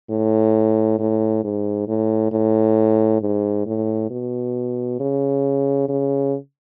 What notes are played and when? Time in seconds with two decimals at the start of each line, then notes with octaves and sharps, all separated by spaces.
0.10 A2
0.99 A2
1.44 G#2
1.88 A2
2.32 A2
3.22 G#2
3.66 A2
4.11 B2
5.00 C#3
5.89 C#3